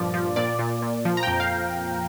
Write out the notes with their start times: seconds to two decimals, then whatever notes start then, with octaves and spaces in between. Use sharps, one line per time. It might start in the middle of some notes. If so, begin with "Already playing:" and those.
Already playing: G2 A#2 F3 D5
0.14 F3
0.36 A#2 D5
0.59 A#2
0.82 A#2
1.05 F3
1.17 A#5
1.23 G5
1.27 F2
1.40 F5